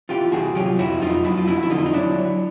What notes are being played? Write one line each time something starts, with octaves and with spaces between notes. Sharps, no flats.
E3 F4 G4
C2 F#4 G#4
F#3 F4 G4
F2 E4 F#4
F2 D#4 F4
F#3 E4 F#4
F4
F2 E4 F#4
E4
D3 D#4 F4
D#4
F#3 D4 E4
F#3